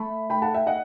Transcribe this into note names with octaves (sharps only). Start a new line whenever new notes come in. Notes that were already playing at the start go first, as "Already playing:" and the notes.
Already playing: A3 B5
G5 B5
F#5 A5
E5 G5
D#5 F#5